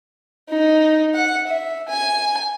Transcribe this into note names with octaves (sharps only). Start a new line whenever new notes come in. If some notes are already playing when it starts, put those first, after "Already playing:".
D#4
F#5
E5
G#5